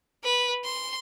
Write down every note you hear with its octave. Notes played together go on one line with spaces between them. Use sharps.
B4
C6